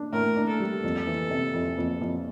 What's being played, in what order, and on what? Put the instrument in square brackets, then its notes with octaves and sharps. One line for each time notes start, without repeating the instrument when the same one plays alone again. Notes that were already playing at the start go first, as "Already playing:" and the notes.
Already playing: [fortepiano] D4
[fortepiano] A2 [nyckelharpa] A#4
[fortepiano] D4
[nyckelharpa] A4
[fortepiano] G3
F2
E3
C3
F2
F2
F2